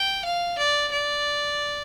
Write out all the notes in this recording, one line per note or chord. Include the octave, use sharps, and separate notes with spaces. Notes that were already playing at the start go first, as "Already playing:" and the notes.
Already playing: G5
F5
D5
D5